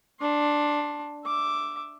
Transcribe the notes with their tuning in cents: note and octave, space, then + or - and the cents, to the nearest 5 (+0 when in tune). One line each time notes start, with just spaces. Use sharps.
D4 +0 C6 +25
E5 +5 D6 +0